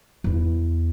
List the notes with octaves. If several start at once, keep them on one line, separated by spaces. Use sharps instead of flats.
E2 E4